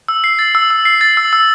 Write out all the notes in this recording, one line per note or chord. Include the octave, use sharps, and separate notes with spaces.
E6
C7
A6
E6
E6
C7
A6
E6
E6